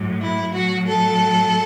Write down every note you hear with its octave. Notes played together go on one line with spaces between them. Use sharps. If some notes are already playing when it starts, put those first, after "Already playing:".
Already playing: A2 F#3
E4
A2 F#3 F#4
A4